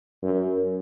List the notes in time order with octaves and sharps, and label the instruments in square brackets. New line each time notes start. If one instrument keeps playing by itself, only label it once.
[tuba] F#2